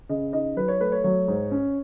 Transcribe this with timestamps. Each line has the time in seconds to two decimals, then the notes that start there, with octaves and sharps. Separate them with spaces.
0.09 C#3 D#5
0.33 D#4 D#5
0.57 F#3 B4
0.68 C#5
0.80 A3 B4
0.92 C#5
1.04 F#3 C#5
1.28 G#2
1.51 C#4